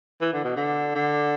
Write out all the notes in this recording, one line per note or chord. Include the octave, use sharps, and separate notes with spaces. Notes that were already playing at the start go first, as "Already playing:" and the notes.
E3
D3
B2
D3
D3